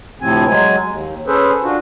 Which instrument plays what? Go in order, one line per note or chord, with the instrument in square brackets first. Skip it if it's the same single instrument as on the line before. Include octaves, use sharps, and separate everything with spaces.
[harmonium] D2 A2 C3 F3 C4 G#5
F#3 G#3 G#5
D#2
C#4 G#4 A4 B4 C5
D4 F4 F#4